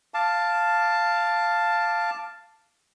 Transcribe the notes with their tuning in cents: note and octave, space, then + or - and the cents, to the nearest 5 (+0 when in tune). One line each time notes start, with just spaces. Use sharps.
F5 +0 A5 +5 D6 +0